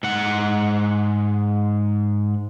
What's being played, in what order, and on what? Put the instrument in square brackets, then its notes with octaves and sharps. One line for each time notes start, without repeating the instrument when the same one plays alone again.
[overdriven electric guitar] G#2 F#5